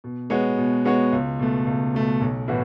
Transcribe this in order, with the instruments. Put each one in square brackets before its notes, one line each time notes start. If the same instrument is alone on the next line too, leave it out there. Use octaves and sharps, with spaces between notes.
[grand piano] B2
G#3 B3 F#4 C#5
B2
G#3 B3 F#4 C#5
C#2
B2 A3
C#2
B2 A3
B1
A2 E3 B3 F#4